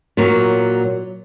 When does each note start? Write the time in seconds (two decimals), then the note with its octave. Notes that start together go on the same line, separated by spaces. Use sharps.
0.17 A#2 F#3